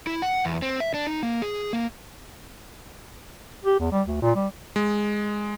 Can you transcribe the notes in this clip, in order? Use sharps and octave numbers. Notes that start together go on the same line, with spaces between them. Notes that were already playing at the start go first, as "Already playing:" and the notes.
E4
F#5
E2
C4
E5
D4
D#4
A#3
G#4
A#3
G4
E2
G3
D2
A#2
G3
G#3